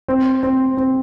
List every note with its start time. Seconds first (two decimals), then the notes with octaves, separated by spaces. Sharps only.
0.08 C4
0.43 C4
0.77 C4